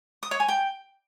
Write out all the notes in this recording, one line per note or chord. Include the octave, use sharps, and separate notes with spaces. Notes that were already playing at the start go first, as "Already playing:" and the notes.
D#6
C#5
G#5
G5